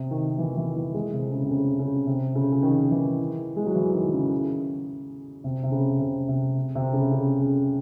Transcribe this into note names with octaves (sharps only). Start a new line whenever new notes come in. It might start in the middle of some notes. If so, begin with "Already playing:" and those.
Already playing: C3
D#3
E3
E3
E3
G#3
C3
C#3
C3
C#3
C#3
C3
C#3
C#3
D#3
E3
G#3
F#3
E3
D#3
C#3
C3
C3
C#3
C3
C3
C3
C#3
C#3
C#3